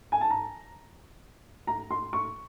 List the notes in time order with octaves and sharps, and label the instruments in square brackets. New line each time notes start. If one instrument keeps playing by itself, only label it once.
[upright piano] G#5
A5
A#5
A#5
C6
C#6